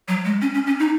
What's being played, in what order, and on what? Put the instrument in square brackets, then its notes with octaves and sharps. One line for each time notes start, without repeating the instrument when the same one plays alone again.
[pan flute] F#3
G#3
C#4
C#4
C#4
D#4